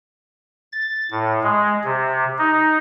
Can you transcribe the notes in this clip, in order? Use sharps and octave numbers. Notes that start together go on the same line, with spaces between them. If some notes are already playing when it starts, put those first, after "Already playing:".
A6
A2
G#3
C3
D#4